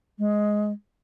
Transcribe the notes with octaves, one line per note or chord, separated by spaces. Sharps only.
G#3